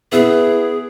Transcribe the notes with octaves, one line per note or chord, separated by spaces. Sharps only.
B3 E4 G#4